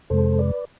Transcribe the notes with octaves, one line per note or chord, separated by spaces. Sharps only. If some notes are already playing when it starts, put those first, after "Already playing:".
F2 C3 G#3 A4 C5
B4 D5